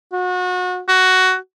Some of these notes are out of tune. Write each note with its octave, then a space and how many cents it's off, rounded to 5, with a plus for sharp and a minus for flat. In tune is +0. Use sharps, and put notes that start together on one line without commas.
F#4 -30
F#4 +10